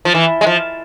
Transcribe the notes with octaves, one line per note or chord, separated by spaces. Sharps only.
F3
E3
G#3
F3